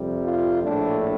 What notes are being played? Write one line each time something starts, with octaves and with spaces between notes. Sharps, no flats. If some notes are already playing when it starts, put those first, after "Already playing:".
Already playing: F2 C3 G3
F4
A#1 A2 A3 D4